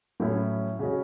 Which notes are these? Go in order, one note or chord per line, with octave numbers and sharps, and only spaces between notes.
A2 F#3 C#4 E4
C#3 G#3 C#4 F#4